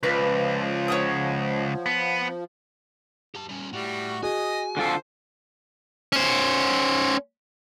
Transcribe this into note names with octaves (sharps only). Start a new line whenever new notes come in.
C#2 F3 B4 D5
C#5 F#5 D#6
B3
G4 A5
G3 C#4
A2 G3 F#4
F#4 G#4 D#5 G#5
D3 F4 A4 C5
C#4 C5